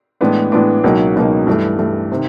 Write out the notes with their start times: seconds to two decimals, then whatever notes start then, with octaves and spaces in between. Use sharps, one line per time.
0.21 A2 E3 G#3 B3 D4
0.52 A2 E3 G#3 B3 D4
0.84 C#2 B2 F#3 A#3 D#4
1.15 C#2 B2 F#3 A#3 D#4
1.47 G2 E3 A3
1.79 G2 E3 A3
2.12 C3 D#3